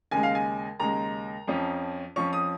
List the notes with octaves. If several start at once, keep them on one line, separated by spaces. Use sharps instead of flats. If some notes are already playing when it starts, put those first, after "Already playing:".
D#2 C#3 G#3 G#5
F5
G#5
D#2 C#3 G#3 A#5
F2 F3 C#4
F2 F3 C#4 C#6
D#6